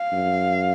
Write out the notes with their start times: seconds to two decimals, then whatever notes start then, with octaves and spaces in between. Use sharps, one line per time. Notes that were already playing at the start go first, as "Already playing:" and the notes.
Already playing: F5
0.13 F#2